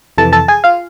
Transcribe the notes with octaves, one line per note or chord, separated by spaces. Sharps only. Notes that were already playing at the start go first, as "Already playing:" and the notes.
F2 C3 E3 A4 A5
A4 A5
G#4 G#5
F4 F5